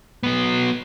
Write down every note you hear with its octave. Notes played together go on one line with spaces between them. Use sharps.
F#3 B3